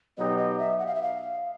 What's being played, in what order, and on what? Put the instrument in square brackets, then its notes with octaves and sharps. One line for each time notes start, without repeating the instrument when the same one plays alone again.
[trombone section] B2 F#3 B3 D#4 G4 [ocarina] D#5
[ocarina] D#5
E5
F#5
F5
E5
F5